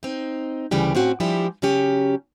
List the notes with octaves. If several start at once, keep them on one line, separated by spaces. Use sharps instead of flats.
C4 D#4
D2 C#3 E3 G3 G4
A2 C4 C#4 F#4 F5
F3 G3 G#3 D4 E4 G4
C#3 F#3 C#4 G4